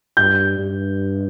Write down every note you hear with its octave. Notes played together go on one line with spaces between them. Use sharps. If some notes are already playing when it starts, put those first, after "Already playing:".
G2 G6
G2